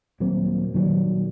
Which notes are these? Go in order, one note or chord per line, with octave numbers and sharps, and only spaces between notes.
D#1 F#3 A#3 C4
A#2 D#3 F#3 G3